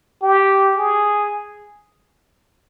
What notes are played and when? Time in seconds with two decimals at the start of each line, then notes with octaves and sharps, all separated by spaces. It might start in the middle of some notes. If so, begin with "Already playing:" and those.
0.22 G4
0.77 G#4